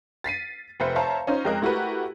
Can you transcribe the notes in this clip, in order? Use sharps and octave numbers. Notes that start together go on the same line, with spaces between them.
A6 B6 C7 D#7
F1 B4 C5 E5 C#7
C5 C#5 E5 F5 A5 A#5
C#4 D#4 F4 C5
F2 G#3 A#4 D#5 F#6
A3 E4 F#4 G4 A#4 B4